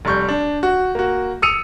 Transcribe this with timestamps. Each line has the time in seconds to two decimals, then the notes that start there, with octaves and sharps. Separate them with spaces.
0.05 F1 G3 C#6 G6
0.29 D4
0.63 F#4
0.95 A#3 F#4
1.42 D#6 E6 C#7 D#7 F7